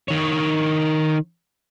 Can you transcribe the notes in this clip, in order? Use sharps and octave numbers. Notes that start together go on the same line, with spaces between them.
D#3 C#5